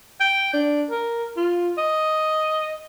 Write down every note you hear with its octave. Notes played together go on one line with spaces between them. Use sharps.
G5
D4
A#4
F4
D#5